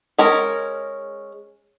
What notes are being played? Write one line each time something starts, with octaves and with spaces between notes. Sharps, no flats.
G#3 C#4 A#4